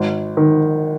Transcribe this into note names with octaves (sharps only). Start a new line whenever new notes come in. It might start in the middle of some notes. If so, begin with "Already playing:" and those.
Already playing: G#1
D#3